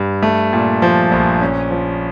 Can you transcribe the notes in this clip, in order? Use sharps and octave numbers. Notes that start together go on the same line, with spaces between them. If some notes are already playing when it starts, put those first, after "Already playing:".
Already playing: G2
A3
A#2
F3
A#1
C#4
F3